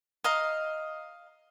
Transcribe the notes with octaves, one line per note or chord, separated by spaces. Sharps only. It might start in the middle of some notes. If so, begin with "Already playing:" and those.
D#5 F5 A#5